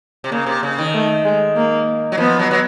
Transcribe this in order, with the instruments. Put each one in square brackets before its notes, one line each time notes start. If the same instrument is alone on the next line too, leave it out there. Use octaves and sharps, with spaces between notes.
[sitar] C3
[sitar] C#3 [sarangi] A#3
[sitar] C3
C#3
D#3
[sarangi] A3
G#3
A#3
[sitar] F#3
[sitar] F3 [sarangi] B3
[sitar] F#3
F#3